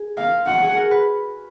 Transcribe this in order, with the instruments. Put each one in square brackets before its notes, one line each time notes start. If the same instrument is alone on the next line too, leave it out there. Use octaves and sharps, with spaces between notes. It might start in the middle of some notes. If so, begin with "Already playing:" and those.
Already playing: [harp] G#4
[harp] A#4 [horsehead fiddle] F5
[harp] F4
[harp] F#4 [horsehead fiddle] F#5
[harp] G#4
A#4
B4